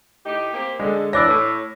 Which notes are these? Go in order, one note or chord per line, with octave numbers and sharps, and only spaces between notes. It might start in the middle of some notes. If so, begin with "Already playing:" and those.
A2 D#4 G4
A#3 C4 G4
D3 G#3
E3 D4 C#5 D6 E6 A#6
A2